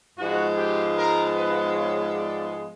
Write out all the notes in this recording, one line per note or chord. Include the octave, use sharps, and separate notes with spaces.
G#2 F3 G#3 B3 F#4
G4
A#4
B4
C#5
D5